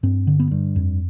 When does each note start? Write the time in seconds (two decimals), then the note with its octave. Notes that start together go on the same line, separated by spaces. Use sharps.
0.03 G2 C4
0.27 D3
0.40 B3
0.51 G2
0.76 F2